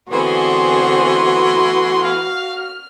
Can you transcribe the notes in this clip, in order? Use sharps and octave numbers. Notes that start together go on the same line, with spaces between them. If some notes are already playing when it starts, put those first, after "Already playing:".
D3 E3 A3 B3 C4 F#4 G#4 C6
F5 F6